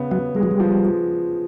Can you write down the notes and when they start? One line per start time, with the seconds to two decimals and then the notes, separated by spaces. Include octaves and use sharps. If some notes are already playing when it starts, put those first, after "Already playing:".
Already playing: C#3 B3
0.11 F#3 B3
0.35 G3 G#3
0.43 F#3
0.51 G3
0.60 F3
0.85 F3